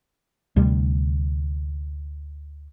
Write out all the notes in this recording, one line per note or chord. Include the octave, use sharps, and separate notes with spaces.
D2 C3 G3